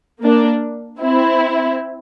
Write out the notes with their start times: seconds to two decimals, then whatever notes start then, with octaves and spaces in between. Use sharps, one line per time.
0.23 A#3 D4
1.00 C4 E4